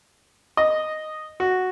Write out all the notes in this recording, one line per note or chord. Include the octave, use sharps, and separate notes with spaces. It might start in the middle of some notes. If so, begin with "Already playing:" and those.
D#5
F#4